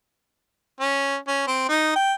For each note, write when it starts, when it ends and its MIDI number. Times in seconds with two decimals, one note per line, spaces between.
0.80 1.16 61
1.28 1.46 61
1.48 1.68 60
1.69 1.92 63
1.96 2.13 79